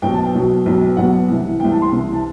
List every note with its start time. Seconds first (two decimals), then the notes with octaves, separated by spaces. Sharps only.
0.02 B1 B2 F#3 G5
0.14 A5
0.24 G5
0.34 B1 B2 F#3
0.66 B1 B2 F#3
0.97 B1 B2 F#3 F#5
1.29 C2 C3 E3
1.60 C2 C3 E3 G5
1.72 A5
1.82 C6
1.92 C2 C3 E3
2.13 A5